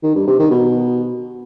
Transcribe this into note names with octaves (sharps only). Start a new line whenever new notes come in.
D#3
G2
C3
D#3
B2